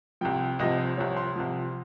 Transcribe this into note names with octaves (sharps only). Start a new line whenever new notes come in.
C2 C3 F3 G5
C2 C3 F3 D#5
C5
C2 C3 F3 C#5
C6
C2 C3 F3